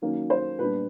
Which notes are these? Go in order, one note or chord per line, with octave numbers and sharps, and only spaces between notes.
D#3 F#3 A#3 C#4
C5
A#2 G3 B3 D4 B4